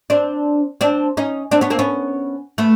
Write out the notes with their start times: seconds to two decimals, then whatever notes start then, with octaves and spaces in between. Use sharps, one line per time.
0.10 C4 D4
0.81 C4 D4
1.17 C#4 D#4
1.51 C4 D4
1.61 B3 C#4
1.70 A#3 C4
1.79 B3 C#4
2.58 A3 B3